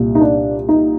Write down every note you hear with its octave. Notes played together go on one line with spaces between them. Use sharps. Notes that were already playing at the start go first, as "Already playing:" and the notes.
Already playing: C2 A#2
D#4
D4
D#4